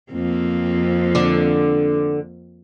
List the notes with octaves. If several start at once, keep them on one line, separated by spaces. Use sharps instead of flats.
F2 A#3 C4
D3 D4